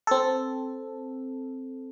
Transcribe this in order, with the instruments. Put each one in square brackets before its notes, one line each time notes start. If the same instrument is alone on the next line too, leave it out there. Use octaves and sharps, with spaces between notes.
[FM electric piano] C4 A4